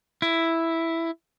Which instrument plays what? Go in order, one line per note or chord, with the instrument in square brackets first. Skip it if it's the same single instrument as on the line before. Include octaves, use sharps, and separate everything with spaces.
[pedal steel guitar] E4